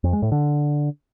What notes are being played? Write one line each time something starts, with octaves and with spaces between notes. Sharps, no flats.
F2
G#3
A2
D3